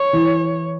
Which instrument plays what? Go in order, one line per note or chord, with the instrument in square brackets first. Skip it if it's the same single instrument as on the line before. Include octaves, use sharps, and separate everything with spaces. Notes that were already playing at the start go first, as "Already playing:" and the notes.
Already playing: [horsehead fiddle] C#5
[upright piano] E3